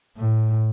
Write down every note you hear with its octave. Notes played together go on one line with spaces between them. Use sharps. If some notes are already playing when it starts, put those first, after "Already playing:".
A2